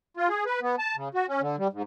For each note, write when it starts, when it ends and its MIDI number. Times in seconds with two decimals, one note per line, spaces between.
0.17 0.28 65
0.29 0.44 68
0.46 0.60 71
0.62 0.76 59
0.79 0.96 81
0.96 1.09 49
1.14 1.26 66
1.29 1.41 61
1.41 1.56 50
1.58 1.68 55
1.73 1.82 44